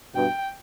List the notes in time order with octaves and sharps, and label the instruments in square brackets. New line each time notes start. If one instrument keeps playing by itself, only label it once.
[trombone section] G2 B2 [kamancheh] G5